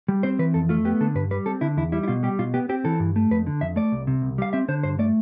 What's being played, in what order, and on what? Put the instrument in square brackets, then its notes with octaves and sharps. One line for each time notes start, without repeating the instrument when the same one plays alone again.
[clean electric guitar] G3
C4 C5
E3 B4
F2 A4
A3 F4
B3 G4
D3 A4
G2 B4
G3 B4
C4 A4
D3 E4
E2 E4
G3 E4
E4
B2 F4
G3 G4
B2 F4
B3 G4
C4 G4
E3 A4
G2
A3
F2 B4
D3
F2 E5
A3 D5
C2
C3
C2
G3 F5
C4 E5
D3 C5
G2 C5
A3 D5